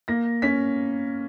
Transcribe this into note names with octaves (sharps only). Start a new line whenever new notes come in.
A#3 A#6
C#4 B6